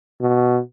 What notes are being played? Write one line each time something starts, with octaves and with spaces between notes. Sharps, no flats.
B2